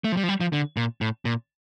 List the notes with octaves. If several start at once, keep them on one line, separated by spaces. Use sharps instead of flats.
A3
F3
G3
F3
G3
F3
D3
A#2
A2
A#2